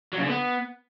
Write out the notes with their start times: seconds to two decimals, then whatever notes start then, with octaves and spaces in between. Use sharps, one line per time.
0.13 F#3
0.18 C#3
0.23 D3
0.28 B3